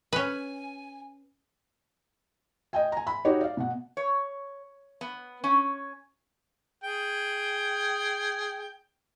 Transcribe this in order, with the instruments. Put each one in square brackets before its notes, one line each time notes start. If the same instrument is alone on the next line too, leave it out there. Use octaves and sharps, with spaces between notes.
[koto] C#4 B4 [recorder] G#5
[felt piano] D#5 G5 G#5
G#5 A#5
B5
D#4 F#4 G4 C#5
D5 F5
B2 F#5
[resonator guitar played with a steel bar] C#5
B3
C#4
[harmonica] G#4 G5